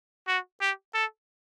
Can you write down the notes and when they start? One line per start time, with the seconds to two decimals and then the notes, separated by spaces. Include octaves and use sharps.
0.28 F#4
0.61 G4
0.94 A4